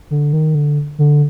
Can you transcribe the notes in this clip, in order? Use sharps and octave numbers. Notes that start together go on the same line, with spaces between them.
D3
D#3
D3
D3